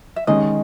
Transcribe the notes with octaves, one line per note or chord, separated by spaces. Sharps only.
E5
D#3 G#3 C#4 D#5